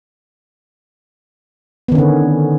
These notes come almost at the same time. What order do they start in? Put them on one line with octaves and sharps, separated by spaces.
B3 D#3 C#4 D3